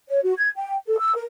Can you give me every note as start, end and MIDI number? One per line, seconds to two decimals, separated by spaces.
0.08 0.19 73
0.24 0.33 66
0.37 0.49 92
0.56 0.74 79
0.86 0.98 69
0.99 1.12 88
1.15 1.23 70